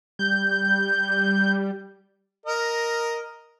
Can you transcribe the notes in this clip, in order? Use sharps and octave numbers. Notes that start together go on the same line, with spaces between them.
G3 G6
A#4 D#5